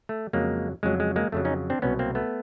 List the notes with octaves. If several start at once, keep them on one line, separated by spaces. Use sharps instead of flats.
A3
F2 C#3 F#3 G#3 A#3
F2 C#3 F#3 G#3
G#3
G#3 A#3
F2 C#3 F#3 A3
C#4 D#4
C4 D4
C2 B2 F#3 B3 C#4
A#3 C4
A3 B3